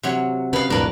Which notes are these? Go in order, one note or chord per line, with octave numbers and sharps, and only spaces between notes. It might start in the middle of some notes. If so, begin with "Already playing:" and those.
C3 F#3 C#5
C#3 B4 F5
B1 F2 A2 D4 A#4 B4